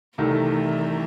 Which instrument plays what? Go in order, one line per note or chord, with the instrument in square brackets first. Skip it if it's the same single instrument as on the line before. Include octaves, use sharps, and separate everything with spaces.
[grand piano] C2 C3 D#3 A3 [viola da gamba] E3